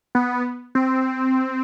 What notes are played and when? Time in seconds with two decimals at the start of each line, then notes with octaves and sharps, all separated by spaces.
0.15 B3
0.75 C4